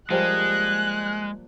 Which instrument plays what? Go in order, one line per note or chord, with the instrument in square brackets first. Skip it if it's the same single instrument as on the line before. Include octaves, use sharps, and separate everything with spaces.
[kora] F3 G3 A#3 [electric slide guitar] G#3 [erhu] F#6